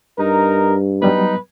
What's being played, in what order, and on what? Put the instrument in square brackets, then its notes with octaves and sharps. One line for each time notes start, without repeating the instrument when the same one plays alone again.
[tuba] G2 [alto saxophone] D#4 [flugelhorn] A#4
[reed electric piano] F#3 G3 B3 [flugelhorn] D#4 [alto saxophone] B4